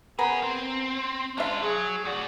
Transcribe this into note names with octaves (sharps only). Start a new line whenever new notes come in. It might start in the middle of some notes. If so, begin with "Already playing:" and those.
B3 C#4 G#4 A#4
C4
G#3 D4 F4 E5 C6
F#3 G#4
A2 F#4 D5